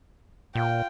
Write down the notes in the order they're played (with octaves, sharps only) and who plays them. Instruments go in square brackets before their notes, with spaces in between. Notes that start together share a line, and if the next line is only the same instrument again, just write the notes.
[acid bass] A#2 [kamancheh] F4 G5